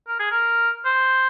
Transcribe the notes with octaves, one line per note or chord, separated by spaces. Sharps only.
A#4
G#4
A#4
C5